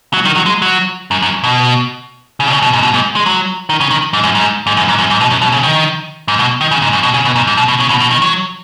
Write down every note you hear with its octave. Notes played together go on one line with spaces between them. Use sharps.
F#3
D#3
F#3
G#3
F#3
F#2
F#2
B2
C#3
B2
C#3
B2
G#2
B2
G#2
G#3
F#3
D#3
C#3
D#3
G#2
F#2
G#2
G#2
F#2
G#2
F#2
G#2
B2
F#2
B2
C#3
D#3
G#2
B2
D#3
C#3
G#2
F#2
B2
C#3
B2
G#2
G#2
B2
B2
C#3
B2
B2
D#3
F#3